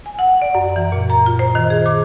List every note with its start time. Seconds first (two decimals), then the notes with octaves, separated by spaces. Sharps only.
0.06 G#5
0.19 F#5
0.42 D5
0.55 F#2
0.76 E3
0.92 A#2
1.10 A#5
1.26 F4
1.39 C5
1.55 D#3
1.70 G#4
1.86 D6